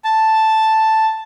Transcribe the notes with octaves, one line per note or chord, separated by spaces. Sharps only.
A5